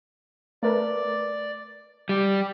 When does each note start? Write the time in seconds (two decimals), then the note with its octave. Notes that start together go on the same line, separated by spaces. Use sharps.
0.63 A3 A#4 B4 D5
2.09 G3 G4